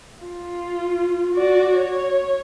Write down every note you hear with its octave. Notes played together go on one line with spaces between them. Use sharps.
F4
F#4 D5
C#5